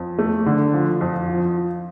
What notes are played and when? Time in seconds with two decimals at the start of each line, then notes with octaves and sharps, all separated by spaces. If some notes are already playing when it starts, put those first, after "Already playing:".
Already playing: F2
0.19 A3
0.46 D3
0.74 F3
1.01 F2
1.28 F3